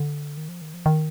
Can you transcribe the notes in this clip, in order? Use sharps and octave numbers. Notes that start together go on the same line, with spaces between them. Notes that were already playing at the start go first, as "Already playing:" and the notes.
Already playing: D3
D#3
F3
D#3
F3
D#3